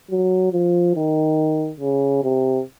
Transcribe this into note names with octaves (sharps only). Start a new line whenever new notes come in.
F#3
F3
D#3
C#3
C3